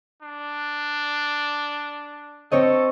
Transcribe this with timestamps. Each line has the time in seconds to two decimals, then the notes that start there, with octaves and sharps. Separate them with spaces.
0.22 D4
2.52 C4 A4 C#5 D#5